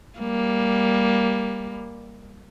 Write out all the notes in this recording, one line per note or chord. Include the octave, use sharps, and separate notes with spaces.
G3 A#3